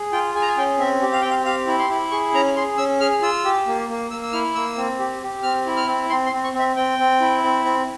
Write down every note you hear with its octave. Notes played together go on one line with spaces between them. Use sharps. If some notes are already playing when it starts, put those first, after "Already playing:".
Already playing: G#4
F4 G5
G#4 G#5
A#5
G#5
C#4 G5
C4 E5
G4
F5
C4 G5
F5
G4 F5
E4
C6
E4
G#4 C#6
C#4 A#5
G#4 C6
C#4 E6
G#4 F6
F4 E6
G4
A#3
A#3
A#3 E6
E6
E4 F6
A#3 E6
C4
G4
G4
C4 F6
E4
F6
C4
C4 C6
C6
C4
C#6
C4
E5
C4 G5
C4
E4
C4
C4